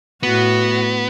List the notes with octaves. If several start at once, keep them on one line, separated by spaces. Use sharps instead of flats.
A2 B3 F#4